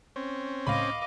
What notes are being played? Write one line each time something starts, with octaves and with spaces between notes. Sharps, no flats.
C4 C#4
C#2 A2 D#5 F5 B5 D6